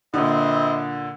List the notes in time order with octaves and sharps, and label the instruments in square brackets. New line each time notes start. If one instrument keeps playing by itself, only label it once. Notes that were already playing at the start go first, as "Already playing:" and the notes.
[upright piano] A#2 D3 [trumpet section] C4 E4 D#5